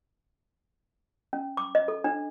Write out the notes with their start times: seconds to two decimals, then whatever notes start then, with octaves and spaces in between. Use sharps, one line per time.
1.33 C#4
1.57 D6
1.75 D#5
1.88 A4
2.04 D4